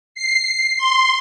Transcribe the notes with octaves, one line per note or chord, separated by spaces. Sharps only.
C7
C6